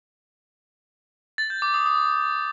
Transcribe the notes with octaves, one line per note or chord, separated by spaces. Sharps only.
A6
G6
D6
D#6
D#6